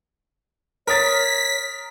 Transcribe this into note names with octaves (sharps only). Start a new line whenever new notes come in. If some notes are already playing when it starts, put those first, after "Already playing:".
A#4 C#5 D#6 A6 B6